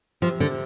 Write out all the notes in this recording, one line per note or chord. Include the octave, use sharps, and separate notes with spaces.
C3 F3
D3